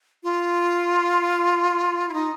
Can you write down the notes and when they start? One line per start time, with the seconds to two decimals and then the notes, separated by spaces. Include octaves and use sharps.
0.23 F4
2.09 E4
2.13 D#4